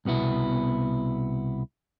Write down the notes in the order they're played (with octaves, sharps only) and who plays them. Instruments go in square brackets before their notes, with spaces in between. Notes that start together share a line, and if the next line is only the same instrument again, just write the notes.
[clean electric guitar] C2 B2 B3 E4